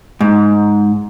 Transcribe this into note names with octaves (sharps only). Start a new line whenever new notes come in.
G#2